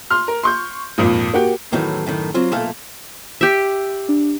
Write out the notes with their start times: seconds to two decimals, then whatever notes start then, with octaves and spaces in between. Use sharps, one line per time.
0.10 C6 F6
0.28 A#4
0.43 C6 C#6 G6
0.98 G#1 F2 A#2
1.34 A#3 F#4 G4
1.72 E2 A2 D#3 E3 F#3
2.06 F#2 A2 D#3
2.34 F#3 C4 F4
2.52 B1 A#2 A3 A4 F5
3.41 G4 E5
4.09 D4